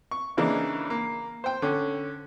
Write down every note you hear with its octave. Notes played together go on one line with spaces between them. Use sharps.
C#6
C#3 E3 A#3 D4 D#4
A#3
C5 G5
D3 C#4